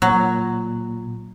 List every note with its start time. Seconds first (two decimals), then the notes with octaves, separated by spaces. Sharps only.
0.02 A#2 F#3